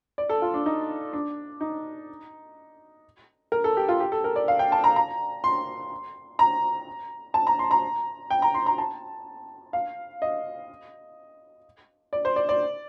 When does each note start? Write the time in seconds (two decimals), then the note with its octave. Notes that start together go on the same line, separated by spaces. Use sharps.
0.18 D5
0.29 A4
0.42 F4
0.54 D4
0.66 D#4
1.13 D4
1.61 D#4
3.52 A#4
3.64 A4
3.77 G4
3.89 F4
4.00 G4
4.12 A4
4.24 A#4
4.36 D5
4.48 F5
4.59 G5
4.72 A5
4.84 A#5
4.96 A#5
5.44 C6
6.39 A#5
7.34 A5
7.47 A#5
7.59 C6
7.71 A#5
8.30 G5
8.42 A#5
8.54 C6
8.66 A#5
8.78 A5
9.73 F5
10.22 D#5
12.13 D5
12.25 C5
12.36 D5
12.49 D5